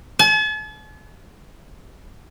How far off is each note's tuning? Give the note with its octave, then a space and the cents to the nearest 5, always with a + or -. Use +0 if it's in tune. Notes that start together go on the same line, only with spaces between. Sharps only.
A5 -45